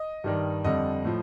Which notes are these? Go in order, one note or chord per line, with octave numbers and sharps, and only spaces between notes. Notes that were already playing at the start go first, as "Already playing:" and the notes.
Already playing: D#5
G2 D#3 G3
F2 D3 G3 D#5
A2 F3